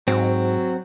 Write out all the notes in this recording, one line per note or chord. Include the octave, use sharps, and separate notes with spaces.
G#2 F#3 C4